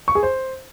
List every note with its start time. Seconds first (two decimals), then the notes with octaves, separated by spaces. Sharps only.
0.08 C#6
0.15 G#4
0.23 C5